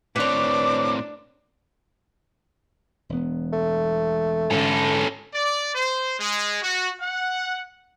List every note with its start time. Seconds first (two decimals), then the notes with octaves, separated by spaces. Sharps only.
0.16 A2 C4 D4 B4 C#5 D6
3.09 E1 B3
3.53 A3
4.50 G#2 D3 C#4 A4
5.34 D5
5.75 C5
6.19 G#3
6.62 F#4
7.01 F#5